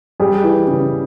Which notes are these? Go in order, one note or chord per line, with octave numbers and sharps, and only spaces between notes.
G3 G#4
E3
C#3